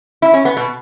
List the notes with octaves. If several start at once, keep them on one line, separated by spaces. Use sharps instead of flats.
E4
C#4
B3
B2